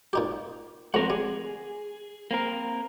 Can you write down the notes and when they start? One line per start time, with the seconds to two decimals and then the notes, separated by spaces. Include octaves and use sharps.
0.13 A#2 D#4 G4
0.94 F2 A3 C4 A#4 F#5
1.10 G3 G#4
2.31 A#3 C4 A#4